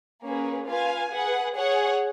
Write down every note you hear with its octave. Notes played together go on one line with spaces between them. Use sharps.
A#3 C#4 G#4 B4
F4 B4 F5 G#5
G#4 B4 F#5
G#4 C#5 F#5